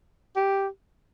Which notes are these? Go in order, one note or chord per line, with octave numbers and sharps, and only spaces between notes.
G4